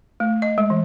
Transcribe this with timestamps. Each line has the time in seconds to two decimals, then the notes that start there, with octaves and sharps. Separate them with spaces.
0.20 A3
0.42 D#5
0.58 G#3
0.70 E3